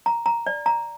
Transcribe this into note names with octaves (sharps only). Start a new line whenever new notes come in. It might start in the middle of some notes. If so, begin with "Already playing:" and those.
A#5
A#5
D5
A#5